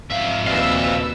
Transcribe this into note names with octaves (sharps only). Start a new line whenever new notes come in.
F2 G#2 E5 F5
D#2 F#4 B4 D5 D#5 F5 E6